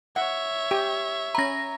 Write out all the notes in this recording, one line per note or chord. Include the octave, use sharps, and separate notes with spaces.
C#5 E5 F#5
G4
C#4 A#5 B5 A#6